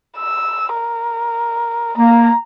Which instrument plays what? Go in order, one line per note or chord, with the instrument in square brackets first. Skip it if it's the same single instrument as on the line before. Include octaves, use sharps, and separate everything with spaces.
[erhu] E6
A#4
[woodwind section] A#3 [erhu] A#5